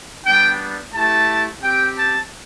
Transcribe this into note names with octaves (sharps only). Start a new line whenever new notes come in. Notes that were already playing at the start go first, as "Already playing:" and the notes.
G3 B3 D4 G5
A3 E4 G4 A5
C4 G4 G5
A5